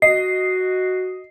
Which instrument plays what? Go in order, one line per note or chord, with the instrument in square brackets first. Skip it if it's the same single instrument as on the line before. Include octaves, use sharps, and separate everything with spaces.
[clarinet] F#4 [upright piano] D#5 [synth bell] C7